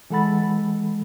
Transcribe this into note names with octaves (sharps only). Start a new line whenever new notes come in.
E3 G#3 A4 F#5 B5 A6